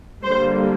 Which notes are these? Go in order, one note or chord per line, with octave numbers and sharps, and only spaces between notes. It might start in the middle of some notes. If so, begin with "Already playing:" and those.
D3 G3 A#3 C5